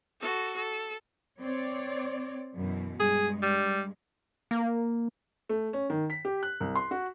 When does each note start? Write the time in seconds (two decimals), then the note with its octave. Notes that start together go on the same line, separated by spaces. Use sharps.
0.21 F#4 A4
0.56 A4
1.41 C4 C#5 D5
2.56 F#2 B2 E3
3.00 G2 G#3 G#4
3.42 G3
4.51 A#3
5.49 A3
5.73 C#4
5.90 D#3
6.10 B6
6.25 G4
6.43 F#6
6.60 C2
6.76 C6
6.91 F#4